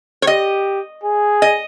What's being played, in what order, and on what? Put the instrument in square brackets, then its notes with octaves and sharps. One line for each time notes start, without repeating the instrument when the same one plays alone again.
[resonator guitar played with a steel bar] C#5
[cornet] G4 [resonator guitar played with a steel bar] D#5
[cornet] G#4
[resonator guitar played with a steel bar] D#5